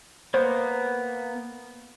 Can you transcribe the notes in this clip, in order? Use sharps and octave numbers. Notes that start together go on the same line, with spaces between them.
A#3 B3 C5